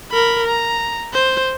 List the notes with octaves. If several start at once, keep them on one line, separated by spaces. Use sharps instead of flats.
A#4 B5
A#5
C5